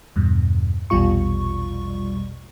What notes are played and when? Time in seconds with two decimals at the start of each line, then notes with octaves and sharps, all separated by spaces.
0.16 E2 G2 B2
0.90 A#1 E2 B2 G3 F4 C#6